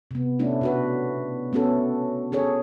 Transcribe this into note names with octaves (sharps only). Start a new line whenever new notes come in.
C3 B3
A3 C#4 D4 E4
B2 F#4 B4
A3 B3 C#4 F#4 A4
C#4 G#4 A4 C#5